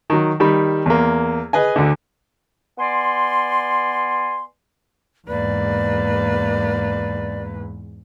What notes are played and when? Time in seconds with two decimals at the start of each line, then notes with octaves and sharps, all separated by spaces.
0.10 D#3 F#3
0.40 D#3 G3 B5
0.86 E2 A#3
1.53 G#4 B4 D#5 G#5
1.76 D2 D3
2.79 B3 D5 G#5 C6
5.28 E2 G#2 A#3 B4 D5